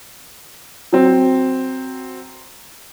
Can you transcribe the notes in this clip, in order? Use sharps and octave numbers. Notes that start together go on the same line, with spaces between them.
F#3 C4